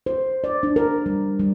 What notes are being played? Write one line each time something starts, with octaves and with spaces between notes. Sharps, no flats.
C5
D5
D4
A#4
G3
G3